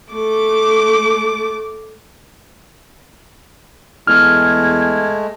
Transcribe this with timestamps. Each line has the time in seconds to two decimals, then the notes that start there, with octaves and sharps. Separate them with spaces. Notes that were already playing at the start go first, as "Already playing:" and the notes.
0.13 A3 D6
4.07 E2 G#3 A3 F6 G#6